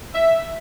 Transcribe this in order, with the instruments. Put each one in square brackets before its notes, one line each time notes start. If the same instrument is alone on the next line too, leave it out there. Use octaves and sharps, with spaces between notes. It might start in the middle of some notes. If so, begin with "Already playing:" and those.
[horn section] E5